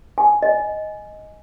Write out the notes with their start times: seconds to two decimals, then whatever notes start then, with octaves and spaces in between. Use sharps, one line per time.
0.18 G#5
0.43 D#5